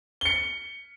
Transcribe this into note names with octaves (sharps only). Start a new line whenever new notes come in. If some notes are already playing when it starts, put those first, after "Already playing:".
C#7 G7